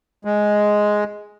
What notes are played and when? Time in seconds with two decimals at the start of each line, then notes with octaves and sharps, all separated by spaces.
0.25 G#3